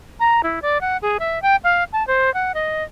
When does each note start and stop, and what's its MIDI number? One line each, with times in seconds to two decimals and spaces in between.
0.20 0.41 82
0.43 0.59 64
0.62 0.81 74
0.81 0.97 78
1.02 1.17 68
1.19 1.42 76
1.42 1.56 79
1.64 1.84 77
1.93 2.05 81
2.07 2.32 72
2.34 2.52 78
2.54 2.84 75